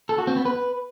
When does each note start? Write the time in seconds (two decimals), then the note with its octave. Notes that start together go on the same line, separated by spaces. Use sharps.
0.09 A4
0.18 F#4
0.27 C4
0.36 B3
0.45 B4